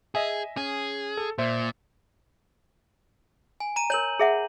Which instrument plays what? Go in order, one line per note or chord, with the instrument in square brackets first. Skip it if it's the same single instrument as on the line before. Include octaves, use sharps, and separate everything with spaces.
[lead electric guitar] G#4 [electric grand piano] D#5 E5 G#5
[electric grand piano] C#4 [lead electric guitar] G#4
[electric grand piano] A4
[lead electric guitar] A#2 [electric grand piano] C5 E5
[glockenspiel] G#5
A#5 D#7
[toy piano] A#4 C#5 [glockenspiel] G6 F#7
[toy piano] G#4 E5 F#5